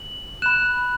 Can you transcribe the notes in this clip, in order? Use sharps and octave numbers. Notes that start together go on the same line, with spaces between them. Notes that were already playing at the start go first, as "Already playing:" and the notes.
Already playing: F#7
B5 F#6 E7